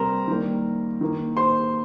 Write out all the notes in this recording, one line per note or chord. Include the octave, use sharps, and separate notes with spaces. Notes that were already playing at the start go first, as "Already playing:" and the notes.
Already playing: C3 G3 C4 A#4 C5 A#5
D#3 G3 A#3
D#3 A#3
C5 C6